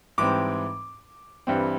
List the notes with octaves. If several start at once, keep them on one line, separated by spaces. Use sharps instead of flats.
G#2 E3 G3 C4 D6
G2 E3 G3 C4